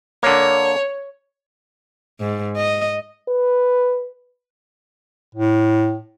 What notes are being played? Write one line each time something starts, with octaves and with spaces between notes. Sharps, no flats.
D3 A#3 C#5
G#2
D#5
B4
A2